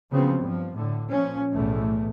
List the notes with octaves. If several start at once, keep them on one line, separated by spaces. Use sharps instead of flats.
C#3 F3 F#3 B3 C4
G2 F3
A2 D3
A#2 F3 C#4
B1 E2 A2 A3